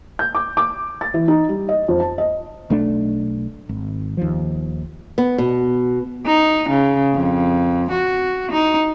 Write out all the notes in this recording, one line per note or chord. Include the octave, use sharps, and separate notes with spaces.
G6
D6
D6
A6
E3
D#4
G3
D#5
F2
A5
D#5
B1 A3 D4
G#1
D#2 F3
B3
B2
D#4
C#3
F2
F#4
D#4